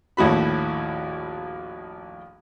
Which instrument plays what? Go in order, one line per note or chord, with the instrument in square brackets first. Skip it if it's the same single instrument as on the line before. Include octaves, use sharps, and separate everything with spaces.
[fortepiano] A#1 D#2 A2 F#4 B5